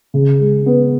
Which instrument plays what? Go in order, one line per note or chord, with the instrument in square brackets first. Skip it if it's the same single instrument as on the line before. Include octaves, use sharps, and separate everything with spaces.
[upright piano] C#3
G#3
B3